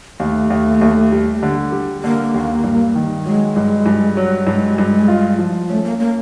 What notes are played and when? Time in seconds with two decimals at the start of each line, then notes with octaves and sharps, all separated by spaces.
0.20 D#2 A3
0.50 D#2
0.81 D#2
1.12 G3
1.43 D3
1.72 G3
2.04 D3 A#3
2.34 D#2
2.64 G2
2.95 D#3
3.25 F#3 G#3
3.56 G2
3.86 G2
4.17 F#3
4.47 G2 G#3
4.78 G2
5.08 F4
5.39 F3
5.69 A3 C#4
5.84 A#3
5.99 A#3 C#4